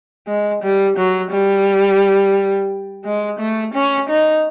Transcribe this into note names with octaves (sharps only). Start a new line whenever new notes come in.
G#3
G3
F#3
G3
G#3
A3
C#4
D#4